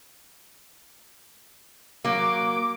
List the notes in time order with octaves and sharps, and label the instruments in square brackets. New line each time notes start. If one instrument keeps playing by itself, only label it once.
[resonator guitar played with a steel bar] F#3 A#3 [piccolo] D6